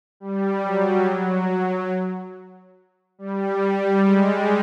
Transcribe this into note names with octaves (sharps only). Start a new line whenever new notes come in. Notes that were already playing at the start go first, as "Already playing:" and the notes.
G3
F#3
G3
G3
G#3